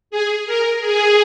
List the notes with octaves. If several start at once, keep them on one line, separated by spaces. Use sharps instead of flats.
G#4
A#4
G#4